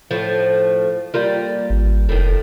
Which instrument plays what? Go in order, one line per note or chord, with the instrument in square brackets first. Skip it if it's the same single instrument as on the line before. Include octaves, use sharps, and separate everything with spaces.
[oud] A2 F3
G3 A#3 F4
[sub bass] G#1
[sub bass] F1 [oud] A2 D#3